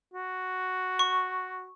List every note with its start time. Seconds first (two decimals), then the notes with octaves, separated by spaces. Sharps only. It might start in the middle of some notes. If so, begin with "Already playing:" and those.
0.14 F#4
0.99 C#6